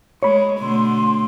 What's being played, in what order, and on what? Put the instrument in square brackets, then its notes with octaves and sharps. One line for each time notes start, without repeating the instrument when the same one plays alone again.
[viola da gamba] G#3 [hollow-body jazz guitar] C#5 B5
[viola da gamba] B2 D3 A3 [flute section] C6